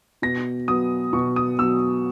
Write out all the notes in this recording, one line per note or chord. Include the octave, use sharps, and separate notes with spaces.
B2 A#6
F#3 B3 D#6
B2 C#6
D#6
F#3 B3 E6